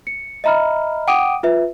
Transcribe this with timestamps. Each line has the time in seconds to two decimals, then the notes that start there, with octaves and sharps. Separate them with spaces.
0.07 C#7
0.44 D#5 E5 A#5 B5 F6
1.07 F#5 G5 D6 D#6 D7 D#7
1.43 F4 B4 E5